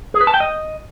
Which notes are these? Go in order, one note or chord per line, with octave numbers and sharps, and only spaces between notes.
G#4
B4
A5
G5
D#5